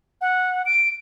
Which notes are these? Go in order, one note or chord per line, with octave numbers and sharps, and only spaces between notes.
F#5
D7